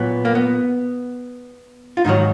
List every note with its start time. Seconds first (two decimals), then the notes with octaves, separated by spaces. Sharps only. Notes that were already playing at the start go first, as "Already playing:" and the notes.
Already playing: A#2 F#3 B3
0.25 A#3
0.35 B3
1.97 F4
2.05 G#2 D#3 F#3 D#4